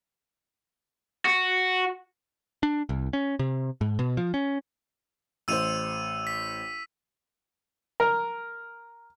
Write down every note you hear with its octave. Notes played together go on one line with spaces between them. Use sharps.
F#4
D4
C2
C#4
C3
G#2
B2
F3
C#4
A1 C5 E6 D#7 F7
B6
A#4